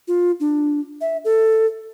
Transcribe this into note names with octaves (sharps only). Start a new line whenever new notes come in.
F4
D4
E5
A4